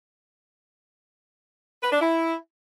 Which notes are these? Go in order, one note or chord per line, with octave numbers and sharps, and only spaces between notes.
B4
D4
E4